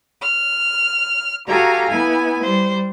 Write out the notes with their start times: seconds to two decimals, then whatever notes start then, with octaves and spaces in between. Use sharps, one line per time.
0.21 F6
1.48 F#4 G4 A4 F5 G#5 A#5
1.88 B3 E4 G#5
2.42 G3 C5